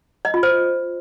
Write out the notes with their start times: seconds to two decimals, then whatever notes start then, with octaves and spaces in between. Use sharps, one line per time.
0.25 D#5
0.34 F4
0.43 C5